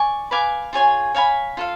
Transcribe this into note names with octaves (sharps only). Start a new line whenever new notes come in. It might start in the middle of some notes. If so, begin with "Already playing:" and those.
Already playing: D5 G#5 C#6
B4 F5 G#5 D6
F4 G#4 C#5 G#5
C#5 F5 G#5 B5
F4 A4 F5